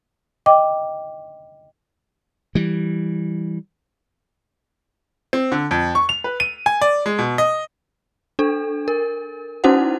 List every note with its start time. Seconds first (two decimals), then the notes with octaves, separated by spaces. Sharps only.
0.46 D#5 G5 D6
2.55 E3 G3
5.33 C4
5.52 D3
5.71 F2
5.95 C#6
6.09 F7
6.24 B4
6.40 D#7
6.66 G#5
6.82 D5
7.06 G#3
7.19 B2
7.38 D#5
8.39 D4 A4
8.88 A#4
9.64 C#4 D#4 E4 F#4 C5 F#5